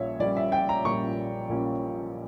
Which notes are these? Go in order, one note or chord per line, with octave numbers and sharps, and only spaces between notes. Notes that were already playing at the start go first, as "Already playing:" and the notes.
Already playing: A#1 A#2 G3 C#4 C#5 E5
A#1 A#2 G3 C#4 D5
E5
G5
A#5
A#1 A#2 G3 C#4 C#6
A#1 A#2 G3 C#4